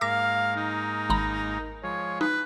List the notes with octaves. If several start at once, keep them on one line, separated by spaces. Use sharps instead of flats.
G#2 A#3 A#4 F5 D6 A#6
D#4
G#1 A#5 B5
F3 G#3 C#5
D#4 B4